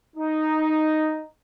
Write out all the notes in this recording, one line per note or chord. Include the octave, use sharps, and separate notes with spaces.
D#4